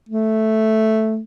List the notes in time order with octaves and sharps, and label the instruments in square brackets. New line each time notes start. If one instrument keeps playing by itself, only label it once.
[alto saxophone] A3